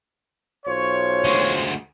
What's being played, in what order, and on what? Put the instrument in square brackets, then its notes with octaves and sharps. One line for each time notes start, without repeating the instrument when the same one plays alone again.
[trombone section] B1 F4 C5 [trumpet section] C#5
[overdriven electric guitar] D2 G#3